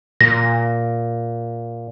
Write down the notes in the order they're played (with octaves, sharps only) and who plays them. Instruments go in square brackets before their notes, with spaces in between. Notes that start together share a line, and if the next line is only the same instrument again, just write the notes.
[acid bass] A#2 [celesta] A#6